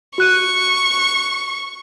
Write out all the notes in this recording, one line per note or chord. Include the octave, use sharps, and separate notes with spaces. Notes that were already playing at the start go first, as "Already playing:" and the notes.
F#4 C#6 F#6 D#7